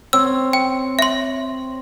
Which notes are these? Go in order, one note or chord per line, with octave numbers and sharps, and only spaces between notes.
C4 C#5 E6
G5
E5 C6